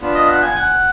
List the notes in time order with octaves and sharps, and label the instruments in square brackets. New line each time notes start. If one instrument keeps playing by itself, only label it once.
[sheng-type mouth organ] B3 D4 F4
[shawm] D#5
F#5
G#5
F#5